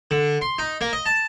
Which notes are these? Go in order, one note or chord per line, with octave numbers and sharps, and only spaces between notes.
D3
C6
D#4
A#3
D#5
A5